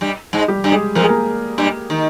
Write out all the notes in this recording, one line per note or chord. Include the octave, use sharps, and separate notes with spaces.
G2 G3
G#2 G#3
G3 G4
G2 G3
G#3 G#4
F2 F3 A#4
G#4
A#3 A#4
G2 G3
D#3